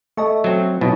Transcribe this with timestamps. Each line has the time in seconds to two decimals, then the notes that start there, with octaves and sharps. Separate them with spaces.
0.17 A3 D#5 A5 C#6
0.44 F#3 C4
0.81 B2 F#3 D#4 E4